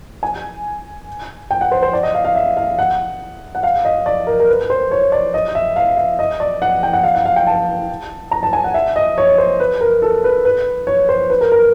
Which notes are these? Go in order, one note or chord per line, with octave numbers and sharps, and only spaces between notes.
G#5
G5
F#5
C5
C5
D5
D#5
F5
F5
E5
F5
F#5
F#5
F5
D#5
D5
A#4
A#4
B4
C5
C#5
D5
D#5
E5
F5
E5
D#5
D5
F#5
G5
F#5
F5
F#5
F5
G5
A5
A#5
A5
G#5
F#5
E5
D#5
C#5
C5
B4
A#4
A4
B4
B4
C#5
C5
B4
A#4
A#4